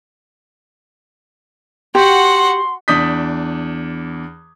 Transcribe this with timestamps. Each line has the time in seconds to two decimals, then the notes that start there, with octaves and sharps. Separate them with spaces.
1.95 F#4 G4 F#5 C6
2.88 E2 D4 D#6 G6 B6